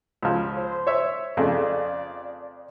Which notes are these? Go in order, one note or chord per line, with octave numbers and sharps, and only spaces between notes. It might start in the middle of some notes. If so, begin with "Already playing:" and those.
C#2 F3
C5
C#5 E5
F2 C#3 A3 D5